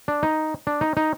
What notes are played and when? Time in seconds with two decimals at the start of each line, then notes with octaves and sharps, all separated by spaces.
0.08 D4
0.23 D#4
0.67 D4
0.81 D#4
0.97 D#4